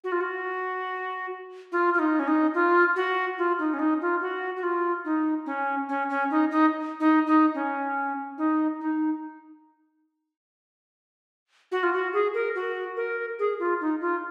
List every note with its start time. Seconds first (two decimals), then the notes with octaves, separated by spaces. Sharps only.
0.04 F#4
0.12 F4
0.21 F#4
1.72 F4
1.94 F4
1.99 D#4
2.19 C#4
2.27 D#4
2.54 F4
2.96 F#4
3.38 F4
3.59 D#4
3.74 C#4
3.79 D#4
4.01 F4
4.21 F#4
4.56 F#4
4.63 F4
5.05 D#4
5.46 C#4
5.89 C#4
6.10 C#4
6.30 D#4
6.51 D#4
7.00 D#4
7.27 D#4
7.54 C#4
8.38 D#4
8.81 D#4
11.72 F#4
11.83 F4
11.93 F#4
12.13 G#4
12.34 A#4
12.55 F#4
12.97 A#4
13.39 G#4
13.59 F4
13.81 D#4
14.01 F4